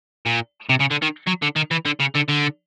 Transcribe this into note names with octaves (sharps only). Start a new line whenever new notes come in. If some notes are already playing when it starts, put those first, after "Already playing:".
A#2
C3
C#3
D3
D#3
F#3
D3
D#3
E3
D3
C#3
D3
D3